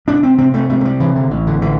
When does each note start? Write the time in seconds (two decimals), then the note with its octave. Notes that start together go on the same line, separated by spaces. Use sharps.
0.07 C3 D4
0.23 C4
0.38 C3 C4
0.54 A3
0.70 C3 A3
0.81 A3
0.85 G3
1.00 C3 E3
1.16 D3
1.31 A1
1.47 D3
1.62 D3 E3